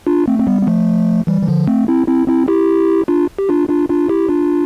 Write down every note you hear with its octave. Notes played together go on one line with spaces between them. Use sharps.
D4 F4
A3 C4
C4
G3 B3
B3
F3 A3
E3 G3
E3
D3 F3
A3 C4
C4 E4
C4 E4
C4 E4
E4 G4
D4 F4
G4
D4 F4
D4 F4
D4 F4
E4 G4
D4 F4